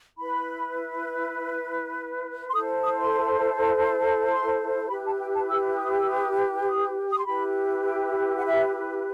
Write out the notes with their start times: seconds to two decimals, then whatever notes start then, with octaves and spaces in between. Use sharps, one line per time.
0.18 E4 B4 B5
2.49 C6
2.53 E4 A4 C5 D#6
2.83 D#6
2.99 C6
4.31 C6
4.89 E4 G4 B4 B5
5.05 A5
5.20 G5
5.33 A5
5.49 E6
5.78 D#6
5.98 E6
6.08 D#6
6.67 D#6
7.11 D#6
7.19 C6
7.26 E4 G4 B4 B5
7.84 G5
8.38 F#5
8.44 E5